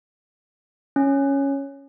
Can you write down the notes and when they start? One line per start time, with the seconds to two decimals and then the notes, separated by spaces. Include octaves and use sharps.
0.96 C#4